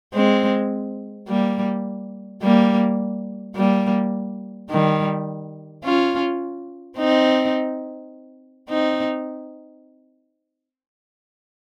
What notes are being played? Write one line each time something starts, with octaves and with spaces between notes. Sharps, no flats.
G#3 C4
G3 A#3
G3 A#3
G3 A#3
D#3 G3
C#4 F4
C4 D#4
C4 D#4